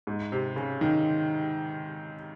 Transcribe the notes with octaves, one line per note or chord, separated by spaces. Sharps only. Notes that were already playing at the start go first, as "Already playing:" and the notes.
G#2
C3
C#3
D#3